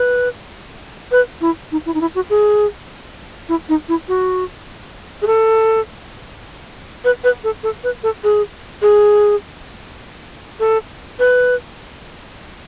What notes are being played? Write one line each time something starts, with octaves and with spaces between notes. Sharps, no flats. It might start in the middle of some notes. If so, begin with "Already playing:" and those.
Already playing: B4
B4
E4
D#4
E4
D#4
E4
F#4
G#4
E4
D#4
E4
F#4
G#4
A4
B4
B4
A4
A4
B4
A4
G#4
G#4
A4
B4